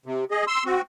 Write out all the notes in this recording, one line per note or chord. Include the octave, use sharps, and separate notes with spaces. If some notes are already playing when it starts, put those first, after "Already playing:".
C3
G#4 D#5
C6 E6
C4 F#4